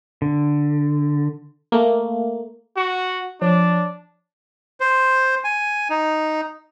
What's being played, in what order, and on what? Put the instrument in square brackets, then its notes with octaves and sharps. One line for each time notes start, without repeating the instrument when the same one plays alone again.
[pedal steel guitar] D3
[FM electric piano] A3 A#3
[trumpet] F#4
[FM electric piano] F3 C#5 [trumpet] D4
[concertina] C5
G#5
D#4